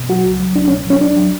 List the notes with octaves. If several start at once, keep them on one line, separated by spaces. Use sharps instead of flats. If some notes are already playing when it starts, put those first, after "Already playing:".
Already playing: B2
F#3 F#4
C#2
F#3
C#2 D4
C#4
B2
F#3 C#4
C#2 D4
F#3